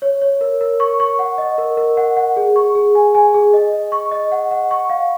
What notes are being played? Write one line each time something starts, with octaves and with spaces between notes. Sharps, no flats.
C#5
C#5
A#4
A#4
C#6
C#6
F#5
D#5
A#4
A#4
F#5
F#5
G#4
C#6
G#4
G#5
G#5
G#4
D#5
D#5
C#6
D#5
F#5
F#5
C#6
F5